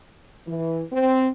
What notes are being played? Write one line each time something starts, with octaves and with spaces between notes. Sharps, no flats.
E3
C4